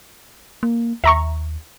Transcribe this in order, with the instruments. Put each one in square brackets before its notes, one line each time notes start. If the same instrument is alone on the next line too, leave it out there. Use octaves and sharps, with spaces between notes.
[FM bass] A#3
[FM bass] D#2 [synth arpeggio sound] E5 A#5 C#6